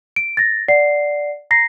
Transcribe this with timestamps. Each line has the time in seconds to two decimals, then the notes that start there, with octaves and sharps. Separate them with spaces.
0.16 D7
0.37 A6 A#6
0.68 D5 F#5 C7
1.51 A#5 A#6 C7